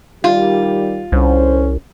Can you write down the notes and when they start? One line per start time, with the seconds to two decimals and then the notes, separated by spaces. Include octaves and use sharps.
0.24 D#3 G3 F4 G4
1.12 C2 D3 C#4 C5